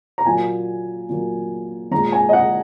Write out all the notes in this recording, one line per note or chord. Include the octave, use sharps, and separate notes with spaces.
A#5
A#2 F#3 A#3 G#5
A#2 F#3 A#3
A#2 G#3 A#5
G#5
D#5
F#5